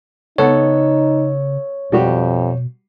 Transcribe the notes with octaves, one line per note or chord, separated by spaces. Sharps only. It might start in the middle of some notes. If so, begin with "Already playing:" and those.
C#3 B3 D#4 A4 C#5 F#5
F2 B2 G3 F#4 G4